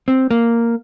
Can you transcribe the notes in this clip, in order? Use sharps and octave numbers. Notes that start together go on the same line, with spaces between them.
C4
A#3